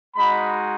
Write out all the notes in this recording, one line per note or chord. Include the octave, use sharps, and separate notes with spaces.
G#3 D#4 F#4 B5